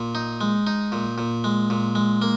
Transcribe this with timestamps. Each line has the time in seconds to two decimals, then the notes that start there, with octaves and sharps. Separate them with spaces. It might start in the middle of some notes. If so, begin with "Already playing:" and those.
Already playing: A#2
0.15 D#4
0.41 G#3
0.67 D#4
0.92 A#2
1.18 A#2
1.44 G#3
1.70 A#2
1.95 G#3
2.22 A#3